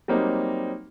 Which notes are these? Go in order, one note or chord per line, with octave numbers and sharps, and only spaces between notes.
F#3 G3 A#3 C4 D#4